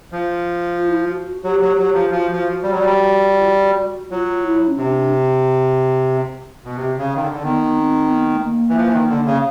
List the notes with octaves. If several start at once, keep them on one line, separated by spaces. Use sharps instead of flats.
F3
F4
E4
F4
F#4
F#3 G4
F#3
F#3
F3
F3 F#4
F3
G3
F#3
G3
F4
F#4
F#3 F4
E4
C#4
C3 D4
B2
C3
C#3
D#3
D3
D3
D#3 B3
C4
B3
A3
A#3
E3
F3
E3
D#3
D3
C#3